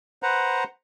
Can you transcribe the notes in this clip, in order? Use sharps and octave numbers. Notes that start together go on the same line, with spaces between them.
B4 C5 F#5 A#5